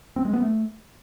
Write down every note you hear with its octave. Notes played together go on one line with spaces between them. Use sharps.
C4
G#3
B3
A3